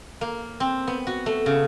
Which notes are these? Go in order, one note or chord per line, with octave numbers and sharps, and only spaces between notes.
A#3
C4
B3
F#4
A3
C#3